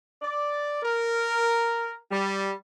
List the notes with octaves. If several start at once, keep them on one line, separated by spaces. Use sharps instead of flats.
D5
A#4
G3